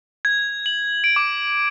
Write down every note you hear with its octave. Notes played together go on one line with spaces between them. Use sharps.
G#6
F#7
D7
D6